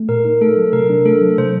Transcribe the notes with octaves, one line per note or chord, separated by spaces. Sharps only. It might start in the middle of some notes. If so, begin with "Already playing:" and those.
Already playing: A3
A#2 A#4
D#4
A3 A4
F#3
C3 A#4
D4
A3 A4
F#3
C3 C5